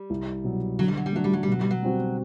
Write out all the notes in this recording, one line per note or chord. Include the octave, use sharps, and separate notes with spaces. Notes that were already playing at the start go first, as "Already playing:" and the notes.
Already playing: G3
C2
B2 F#3
D3 F#3
G3
F#3
G3
F#3 A3 D4 F#4
G3
F#3
G3
B2 F#3
G3
F#3
G3 C4 F#4